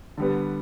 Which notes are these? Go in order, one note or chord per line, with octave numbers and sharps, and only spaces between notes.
D3 G3 B3